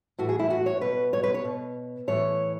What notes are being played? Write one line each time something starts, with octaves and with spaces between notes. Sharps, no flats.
A2 E3 F#4
G#4
E4
F#4
C#5
B2 B4
C#5
B4
C#5
B2
A2 E3 C#5